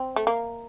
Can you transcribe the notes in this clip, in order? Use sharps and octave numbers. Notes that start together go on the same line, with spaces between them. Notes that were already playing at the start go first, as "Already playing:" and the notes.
Already playing: C4
A3
A#3